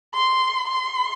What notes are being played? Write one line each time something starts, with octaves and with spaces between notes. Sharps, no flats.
C6
C6